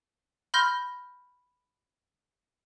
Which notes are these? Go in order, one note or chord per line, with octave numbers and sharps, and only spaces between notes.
B5 C6 F6 G6 A#6